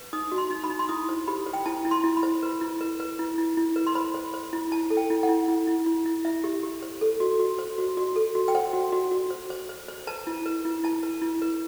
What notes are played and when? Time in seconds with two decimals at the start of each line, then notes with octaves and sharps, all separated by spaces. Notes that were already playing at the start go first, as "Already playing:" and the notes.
Already playing: B4
0.13 D#4 D#6
0.32 F#4
0.38 C6
0.50 D#4
0.64 B5
0.70 D#4
0.79 C6
0.89 E4 D#6
1.09 C5
1.28 G4 B5
1.46 C5
1.53 G5
1.66 E4 A5
1.85 E4
1.91 C6
2.04 E4
2.17 B5
2.23 C5
2.43 B4
2.61 E4
2.81 B4
3.00 B4
3.19 E4
3.38 E4
3.57 E4
3.76 B4
3.87 C6
3.95 C5 B5
4.14 C5
4.34 C5
4.53 E4
4.71 E4 A5
4.90 A4
4.97 G5
5.10 E4
5.23 F#5
5.29 E4
5.48 E4
5.67 E4
5.86 E4
6.06 E4
6.25 E4 E5
6.44 G4
6.63 G4
6.82 C5
7.01 A4
7.20 F#4
7.39 F#4
7.59 C5
7.78 F#4
7.97 F#4
8.16 A4
8.35 F#4
8.48 G5
8.55 C5 F#5
8.73 F#4
8.92 F#4
9.11 F#4
9.30 C5
9.50 C5
9.69 C5
9.88 C5
10.07 B4 A5
10.27 E4
10.46 B4
10.65 E4
10.84 E4 A5
11.03 B4
11.22 E4
11.42 B4